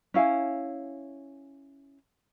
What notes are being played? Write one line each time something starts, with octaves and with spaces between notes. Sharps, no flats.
C#4 E4 F5 G#5